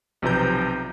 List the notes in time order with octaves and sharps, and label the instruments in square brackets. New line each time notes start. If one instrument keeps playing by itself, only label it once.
[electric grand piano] B1 C3 F3 B4 A#5 G6